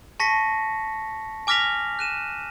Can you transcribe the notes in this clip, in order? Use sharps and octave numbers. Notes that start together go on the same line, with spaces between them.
A5 C#6 A#6 B6 C#7
G#5 D6 F6 A#6 B6 F7
F#6 D#7 E7